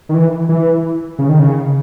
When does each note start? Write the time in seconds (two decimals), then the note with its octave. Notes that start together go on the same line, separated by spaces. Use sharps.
0.09 D#3
0.14 E3
0.49 E3
1.19 C#3
1.29 D#3
1.39 C#3